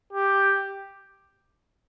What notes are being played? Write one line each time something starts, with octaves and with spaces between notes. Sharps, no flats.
G4